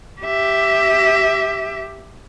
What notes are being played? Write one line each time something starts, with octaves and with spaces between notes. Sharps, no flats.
G4 E5